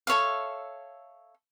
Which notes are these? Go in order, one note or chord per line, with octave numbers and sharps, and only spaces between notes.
A4 C#5 E5 F5